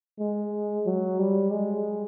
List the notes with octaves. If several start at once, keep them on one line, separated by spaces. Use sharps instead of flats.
G#3
F#3
G3
G#3